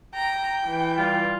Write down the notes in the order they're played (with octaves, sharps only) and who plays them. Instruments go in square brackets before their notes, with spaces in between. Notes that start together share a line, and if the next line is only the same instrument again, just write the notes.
[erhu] G5 [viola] A#5
[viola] E3
[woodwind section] G3 F4